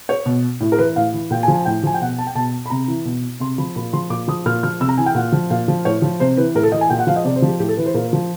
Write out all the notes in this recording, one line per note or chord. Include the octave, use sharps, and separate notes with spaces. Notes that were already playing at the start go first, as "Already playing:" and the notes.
C#5
B2
A2
A#4
E3 B4
A2 F5
E3
A#2 G5
G#5
F3
G#5
A2 G5
F3 G#5
G5
B2 F#5
A5
G5
B2 A5
B5
C3 A#5
E3
B2
C3 C6
F3 B5
A#2 B5
F3 C6
A#2 D6
F3 D#6
A#2 F6
F3 F6
C3 E6
A#5
E3 G#5
G5
A#2 F#5
F3
A#2 F5
F3
A2 C#5
F3
C3 C5
E3 B4
A2 A#4
A4
E3 D#5
G#5
A#2 G5
F#5
F3 F5
D#5
C3 D5
C5
F3
G4
A2 G4
A4
E3 B4
C5
A#2 A#4
F3